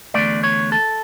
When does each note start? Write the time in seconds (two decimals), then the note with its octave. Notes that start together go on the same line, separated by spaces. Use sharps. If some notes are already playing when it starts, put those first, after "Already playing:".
0.14 E2 D3 A3 D5
0.43 C#5
0.72 A4